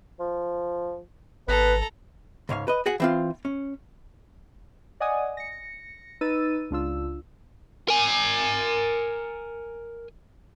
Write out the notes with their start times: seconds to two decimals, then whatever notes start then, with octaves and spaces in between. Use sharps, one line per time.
0.20 F3
1.48 G#1 B3 A4 B4 A#5
2.49 C#2 G#2 C#5 F5
2.68 B4 D#5
2.86 F#4 G#4 F#5
3.00 E3 C4 F4
3.45 C#4
5.00 D5 D#5 F#5 G#5 D#6
5.37 A#6 C#7
6.21 D#4 B4 E6 A6 D#7
6.71 C#2 D4 F4 E6
7.88 A#4 G#5